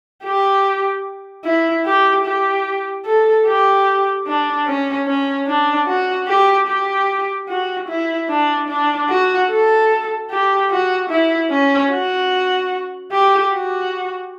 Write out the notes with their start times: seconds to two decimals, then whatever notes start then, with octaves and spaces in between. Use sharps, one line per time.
0.24 G4
1.44 E4
1.86 G4
2.25 G4
3.06 A4
3.47 G4
4.26 D4
4.67 C#4
5.07 C#4
5.47 D4
5.87 F#4
6.28 G4
6.67 G4
7.49 F#4
7.88 E4
8.29 D4
8.69 D4
9.09 F#4
9.50 A4
10.31 G4
10.71 F#4
11.10 E4
11.51 C#4
11.91 F#4
13.12 G4
13.52 F#4